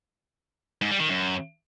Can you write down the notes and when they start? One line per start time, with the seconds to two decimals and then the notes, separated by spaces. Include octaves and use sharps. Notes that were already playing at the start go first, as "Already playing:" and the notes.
0.82 G#2
0.91 G3
1.00 D#3
1.09 F#2